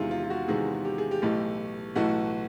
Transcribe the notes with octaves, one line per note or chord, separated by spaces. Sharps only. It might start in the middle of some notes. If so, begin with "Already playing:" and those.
Already playing: E2 C3 D#3 G#3 E4 F4
F4
F4
F#4
E2 C3 D#3 G#3 G#4
G4
G#4
G4
B1 A2 E3 A3
B1 A2 E3 A3 F#4